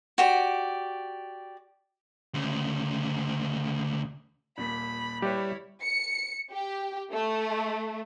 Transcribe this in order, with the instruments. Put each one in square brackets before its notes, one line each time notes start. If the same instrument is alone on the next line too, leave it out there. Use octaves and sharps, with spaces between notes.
[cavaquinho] F#4 G4 D5
[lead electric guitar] D2 C#3
[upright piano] D#1 A#2 B6 [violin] B5
[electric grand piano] G3 [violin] E4 C#5 [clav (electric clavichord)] G4 B4
[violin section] C#7
G4
A3